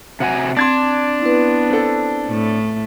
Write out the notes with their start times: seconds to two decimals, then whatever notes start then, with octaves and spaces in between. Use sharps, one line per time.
0.20 C3 F#4 F#5 G#5
0.57 C4 D4 C6 G#6 A6
1.22 B3 E4 B4
1.70 C4 A4
2.28 A2 A3